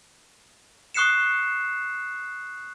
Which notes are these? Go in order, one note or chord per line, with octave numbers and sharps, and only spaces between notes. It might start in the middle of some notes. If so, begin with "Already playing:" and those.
C#6 D#6 F#6 C7 C#7 E7